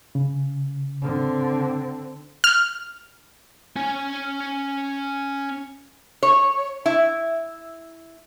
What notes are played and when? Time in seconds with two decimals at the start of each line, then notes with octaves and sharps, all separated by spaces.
0.15 C#3
1.02 D3 C4
2.44 F6
3.76 C#4 G#5
6.23 C#5
6.86 E4